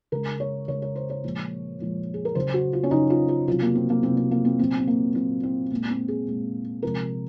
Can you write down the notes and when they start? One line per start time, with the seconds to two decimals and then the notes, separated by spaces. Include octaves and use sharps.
0.12 C#3 G#3 A#4
0.40 C#5
0.68 C#3 G#3 C#5
0.82 C#5
0.96 C5
1.10 C#5
1.24 A#2 F3 G#3
1.80 A#2 F3 G#3
2.14 G#4
2.25 A#4
2.35 C#3 F#3 C5
2.54 F#4
2.73 F4
2.83 C#4
2.91 C#3 F#3 D#4
3.10 F4
3.29 F4
3.48 C3 F#3 F4
3.62 A#3
3.75 C4
3.90 A#3
4.03 C3 F#3 C4
4.17 C4
4.31 A#3
4.45 C4
4.59 A#2 F#3 C4
4.78 C4
4.87 A#3
5.15 A#2 F#3 C4
5.43 C4
5.71 A#2 G#3 A#3
5.90 C4
6.08 G#4
6.27 A#2 G#3
6.82 C3 F3 G#3 A#4